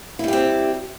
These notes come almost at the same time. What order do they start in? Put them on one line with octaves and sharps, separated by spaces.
E4 G3 G4 C4